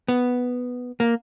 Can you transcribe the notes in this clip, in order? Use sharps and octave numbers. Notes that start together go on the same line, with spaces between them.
B3
A#3